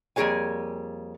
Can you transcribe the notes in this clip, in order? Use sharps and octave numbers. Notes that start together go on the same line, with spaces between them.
F2 G3 A#3 G#4 C#5 G#5